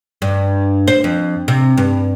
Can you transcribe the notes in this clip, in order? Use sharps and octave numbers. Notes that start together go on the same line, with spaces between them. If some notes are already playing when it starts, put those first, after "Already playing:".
G2
C5
F2
C3
G2